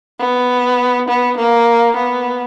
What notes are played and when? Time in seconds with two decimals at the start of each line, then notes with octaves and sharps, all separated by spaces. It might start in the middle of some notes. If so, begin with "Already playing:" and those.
0.19 B3
1.08 B3
1.37 A#3
1.96 B3